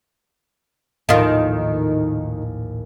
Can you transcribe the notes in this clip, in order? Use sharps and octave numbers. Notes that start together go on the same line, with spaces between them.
A#1 D#2 A2 D#3 F4